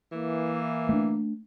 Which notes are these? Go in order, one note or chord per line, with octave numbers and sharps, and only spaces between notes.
E3 A#3
A3 C4 D4